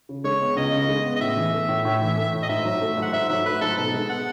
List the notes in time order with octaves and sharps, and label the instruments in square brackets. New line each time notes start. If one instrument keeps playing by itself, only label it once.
[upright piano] C#3
[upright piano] G#3 [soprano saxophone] C#5
[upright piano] B3
[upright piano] C#2 [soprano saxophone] D#5
[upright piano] C#3
G#3
B3
[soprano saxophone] D#5
[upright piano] A2 [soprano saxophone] E5
[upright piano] E3
A3
A2
A2
E3
A3
A2
[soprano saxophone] D#5
[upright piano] G#2 [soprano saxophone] E5
[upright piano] F#3
A3
G#2
[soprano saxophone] F#5
[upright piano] G#2 [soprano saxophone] E5
[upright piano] F#3 [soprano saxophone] E5
[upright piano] A3 [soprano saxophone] B4
[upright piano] G#2 [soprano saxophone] A4
[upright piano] B2 [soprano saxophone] A4
[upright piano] G#3
[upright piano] B3 [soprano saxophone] F#5